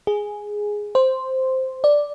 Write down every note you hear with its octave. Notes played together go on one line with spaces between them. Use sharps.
G#4
C5
D5